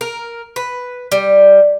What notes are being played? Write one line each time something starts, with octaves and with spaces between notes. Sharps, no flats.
A#4
B4
G3